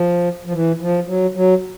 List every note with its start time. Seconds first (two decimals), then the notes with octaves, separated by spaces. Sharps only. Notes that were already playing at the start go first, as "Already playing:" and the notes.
Already playing: F3
0.46 F3
0.53 E3
0.81 F3
1.07 F#3
1.35 F#3